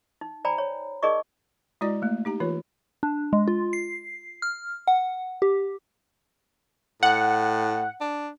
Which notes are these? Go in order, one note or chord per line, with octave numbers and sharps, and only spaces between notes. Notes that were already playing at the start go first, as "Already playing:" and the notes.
D#4
C5 D5 G5 G#5 A#5 B5
C#5
D#4 G#4 A#4 D5 D#5 C#6
G#3 E4 F#4 D5 D#5
A3 A#3
D#4 G4 A#5
E3 F4 B4 C#5
D4
G#3
F4
C7
F6
F#5
G4
A2 F#5
D4